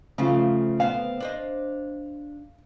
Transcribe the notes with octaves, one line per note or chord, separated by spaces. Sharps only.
C#3 F3 A3 C4 F4
D2 B3 C4 F5
D4 C5 D#5